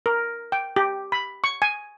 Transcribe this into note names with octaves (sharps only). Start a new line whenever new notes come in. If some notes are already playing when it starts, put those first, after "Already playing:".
A#4
G5
G4
B5
C#6
G#5